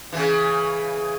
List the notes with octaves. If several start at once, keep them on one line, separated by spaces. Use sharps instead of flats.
C#3 E3